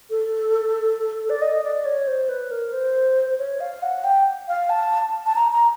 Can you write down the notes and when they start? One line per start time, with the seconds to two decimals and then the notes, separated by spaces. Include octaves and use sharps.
0.10 A4
1.30 D5
1.42 D#5
1.64 D5
1.85 C#5
2.07 C5
2.29 B4
2.51 A#4
2.73 C5
3.30 C5
3.39 C#5
3.60 F5
3.82 F#5
4.04 G5
4.48 F5
4.70 A5
5.26 A5
5.36 A#5
5.52 A#5